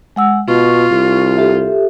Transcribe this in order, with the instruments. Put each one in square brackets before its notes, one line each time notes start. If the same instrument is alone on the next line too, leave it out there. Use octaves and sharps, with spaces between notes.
[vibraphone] G#3 F#5 E6
[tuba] B2 [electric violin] F4 [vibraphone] C#6
[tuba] C2
[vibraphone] G4 A4 E5